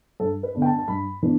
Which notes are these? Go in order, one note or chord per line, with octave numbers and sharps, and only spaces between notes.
G2 A4
B4
D3 B3 D4
G5
A5
A5
G2 B5
E3 B3 D4